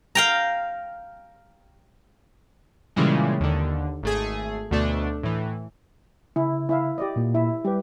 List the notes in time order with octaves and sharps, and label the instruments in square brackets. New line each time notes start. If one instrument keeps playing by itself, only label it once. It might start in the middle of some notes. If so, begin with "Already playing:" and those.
[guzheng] F5 G5 A#5
[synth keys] A#2 C#3 E3 G3 G#3
D#2 D3
G#1 A3 G#4
D2 B2 A3 D4
A2 E3
[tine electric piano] C#3 [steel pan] E4
[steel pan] E4 E5 F5
G4 D5 D#5
[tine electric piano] A#2 A#3
[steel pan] E4 E5
[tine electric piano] G3 B4 [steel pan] G4